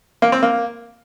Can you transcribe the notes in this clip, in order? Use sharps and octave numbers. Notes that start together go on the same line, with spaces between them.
A#3
C4
A#3